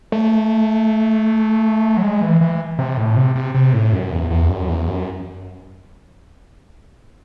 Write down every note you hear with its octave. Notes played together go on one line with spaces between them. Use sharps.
A3
F#3
G#3
E3
E3
C3
A2
C3
C3
C3
A2
F#2
E2
E2
F#2
E2
F#2